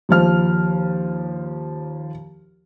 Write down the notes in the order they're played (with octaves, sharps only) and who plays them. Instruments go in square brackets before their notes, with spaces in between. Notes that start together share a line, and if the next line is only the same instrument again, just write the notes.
[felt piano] D#2 F3 F6